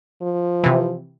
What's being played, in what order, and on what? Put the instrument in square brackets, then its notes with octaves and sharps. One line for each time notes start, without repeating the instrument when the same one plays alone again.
[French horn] F3
[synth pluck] C3 E3